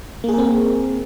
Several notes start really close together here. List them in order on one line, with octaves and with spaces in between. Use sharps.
A#3 G#4 A#4 C4